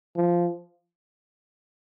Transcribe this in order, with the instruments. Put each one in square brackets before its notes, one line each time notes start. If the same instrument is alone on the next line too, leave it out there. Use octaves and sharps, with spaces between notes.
[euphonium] F3